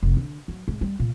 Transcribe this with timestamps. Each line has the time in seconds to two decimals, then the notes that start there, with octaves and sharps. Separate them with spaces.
0.03 F1
0.17 D3
0.48 F#3
0.68 G#2
0.81 G3
1.00 A#2